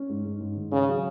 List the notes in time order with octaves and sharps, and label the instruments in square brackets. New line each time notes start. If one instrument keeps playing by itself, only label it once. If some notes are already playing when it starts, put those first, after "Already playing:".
Already playing: [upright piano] C#4
G#2
G#2
G#2
D#3
[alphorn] C#3 [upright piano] C#4
[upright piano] F#3